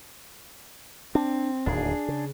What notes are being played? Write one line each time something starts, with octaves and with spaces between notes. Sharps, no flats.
C4 D4
D1 D#2 D#3 D4 G#4
C#3